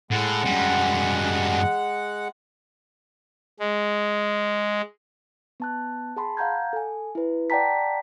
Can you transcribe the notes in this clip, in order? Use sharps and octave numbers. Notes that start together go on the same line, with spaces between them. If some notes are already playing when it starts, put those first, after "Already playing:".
A2 G#3 F#5
F#2 G3
G#3
B3 A5 F#6
G#4 F#5 A5 B5 C6
F5 F#5 A#5 G6 G#6
A4 G#5
E4 B4
D5 F#5 G5 A5 A#5 B6